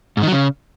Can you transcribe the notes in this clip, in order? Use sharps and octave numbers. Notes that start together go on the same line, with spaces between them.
G#2
D#3
F#3
C#3